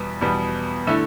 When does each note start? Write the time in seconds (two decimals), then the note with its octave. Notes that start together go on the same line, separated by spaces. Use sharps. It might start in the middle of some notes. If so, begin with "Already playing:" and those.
Already playing: E2 B2 G3 B3
0.21 E2 B2 G3 B3
0.87 D3 A3 E4